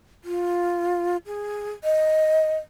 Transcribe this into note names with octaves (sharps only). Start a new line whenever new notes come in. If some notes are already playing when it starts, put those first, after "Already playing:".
F4
G#4
D#5